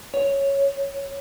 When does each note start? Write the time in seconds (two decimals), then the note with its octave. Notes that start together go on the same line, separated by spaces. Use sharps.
0.14 C#5